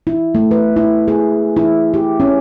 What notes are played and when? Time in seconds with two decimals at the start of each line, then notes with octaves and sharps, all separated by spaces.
0.07 E4
0.35 A3
0.51 B4
0.76 E4
1.08 G#4
1.57 E4
1.94 G4
2.20 C#4